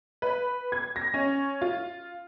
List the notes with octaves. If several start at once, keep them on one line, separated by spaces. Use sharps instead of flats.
B4
G#6
A#6
C#4
F4